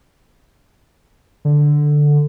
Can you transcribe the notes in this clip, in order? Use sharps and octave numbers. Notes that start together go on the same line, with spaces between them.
D3